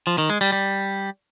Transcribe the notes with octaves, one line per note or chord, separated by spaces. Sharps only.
F3
D#3
G#3
G3
G3